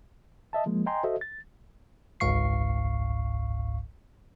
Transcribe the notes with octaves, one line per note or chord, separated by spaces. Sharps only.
D#5 E5 A5
F3 G#3 A#3
D#5 G5 G#5 A#5 C6
F#4 A4 C5 D#5 E5
A6
G1 C#2 G#2 F5 C#6 C7